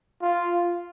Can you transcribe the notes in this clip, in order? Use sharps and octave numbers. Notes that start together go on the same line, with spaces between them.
F4